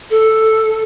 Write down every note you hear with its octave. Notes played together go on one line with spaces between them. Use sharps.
A4